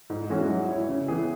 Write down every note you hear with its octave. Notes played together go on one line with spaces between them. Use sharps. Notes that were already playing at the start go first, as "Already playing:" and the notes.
G#2
E3 G#3 C#4 F#4
F#3
E4 C#5
C#3
E3 B3 G#4